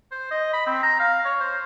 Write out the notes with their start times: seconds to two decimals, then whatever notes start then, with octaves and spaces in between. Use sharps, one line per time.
0.12 C5
0.31 D#5
0.53 B5
0.67 C4
0.83 A#5
1.00 F5
1.25 C#5
1.40 C5